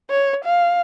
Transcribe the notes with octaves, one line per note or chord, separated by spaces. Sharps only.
C#5
F5